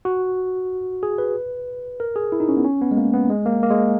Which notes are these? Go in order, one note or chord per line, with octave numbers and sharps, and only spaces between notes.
F#4
G#4
B4
A#4
G#4
E4
D#4
C#4
B3
C#4
B3
G#3
A#3
B3
G#3
A#3
A#3
G#3